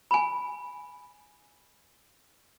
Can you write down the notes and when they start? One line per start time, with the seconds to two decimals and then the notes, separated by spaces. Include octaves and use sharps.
0.11 G#5 B5